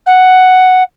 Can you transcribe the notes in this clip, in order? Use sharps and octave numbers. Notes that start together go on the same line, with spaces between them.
F#5